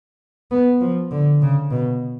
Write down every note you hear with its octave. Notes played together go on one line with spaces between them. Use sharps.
B3
F3
D3
C#3
B2